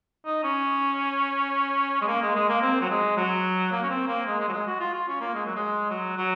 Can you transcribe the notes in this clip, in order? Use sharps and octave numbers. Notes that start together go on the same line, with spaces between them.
D#4
C#4
G#3
A#3
G#3
G#3
A#3
C4
F#3
G#3
F#3
A#3
C#4
C4
A#3
G#3
G#3
F#3
G#3
F#4
F4
F4
C#4
A#3
G#3
F#3
G#3
F#3
F#3